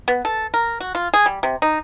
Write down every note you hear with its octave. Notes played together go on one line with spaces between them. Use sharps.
B3
A4
A#4
F#4
F4
G#4
G3
C3
D#4